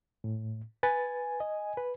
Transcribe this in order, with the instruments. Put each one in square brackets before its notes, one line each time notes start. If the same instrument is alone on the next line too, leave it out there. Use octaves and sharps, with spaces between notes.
[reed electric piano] A2
[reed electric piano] B4 A6 [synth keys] G#5
[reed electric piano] D#5
B4